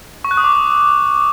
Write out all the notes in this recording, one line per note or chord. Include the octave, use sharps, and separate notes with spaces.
C#6
F#6
D#6
D6